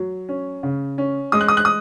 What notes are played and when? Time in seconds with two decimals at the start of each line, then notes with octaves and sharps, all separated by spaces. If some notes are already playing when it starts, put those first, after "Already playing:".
Already playing: F#3
0.29 C#4
0.63 C#3
0.98 C#4
1.32 G#3 D#6
1.41 F#6
1.48 D#6
1.57 F#6
1.65 D#6